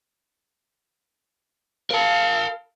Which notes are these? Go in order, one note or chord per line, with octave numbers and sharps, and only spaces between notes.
A#4 F5 A5